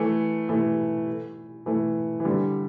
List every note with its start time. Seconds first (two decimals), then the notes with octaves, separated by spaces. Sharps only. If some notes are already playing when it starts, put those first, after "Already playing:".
Already playing: E3 A3
0.49 E3 A3
1.66 E3 A3
2.20 E3
2.25 D3 G3